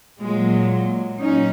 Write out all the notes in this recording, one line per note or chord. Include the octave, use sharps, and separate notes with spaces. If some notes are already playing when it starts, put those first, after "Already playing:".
A#2 F#3 G#3
A#2 F#3 C#4 D#4